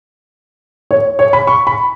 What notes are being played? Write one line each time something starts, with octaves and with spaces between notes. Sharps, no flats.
C#5
C#5
B5
C#6
B5